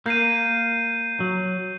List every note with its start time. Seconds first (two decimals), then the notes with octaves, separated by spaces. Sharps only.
0.06 A#3 G6 C7 D#7
1.20 F#3